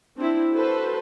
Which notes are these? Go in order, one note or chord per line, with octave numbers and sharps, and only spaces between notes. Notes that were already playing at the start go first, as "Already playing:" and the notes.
C4 D4 E4
F#4 A4 B4 C5